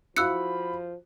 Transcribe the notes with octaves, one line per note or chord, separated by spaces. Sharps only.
F3 E4 F#4 F5 B5 E6 F#6 C#7